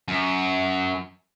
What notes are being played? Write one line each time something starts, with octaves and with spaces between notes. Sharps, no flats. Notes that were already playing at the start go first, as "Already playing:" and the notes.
F#2